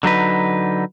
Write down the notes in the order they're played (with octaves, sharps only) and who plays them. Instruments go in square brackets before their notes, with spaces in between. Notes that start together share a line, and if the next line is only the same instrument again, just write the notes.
[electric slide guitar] D3 F#3 D#4 B4